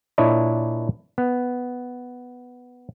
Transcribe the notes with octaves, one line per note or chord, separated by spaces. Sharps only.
A#2 D4 E4 C#5 D#5
B3